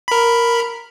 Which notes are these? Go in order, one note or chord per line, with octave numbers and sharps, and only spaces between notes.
A#4 B5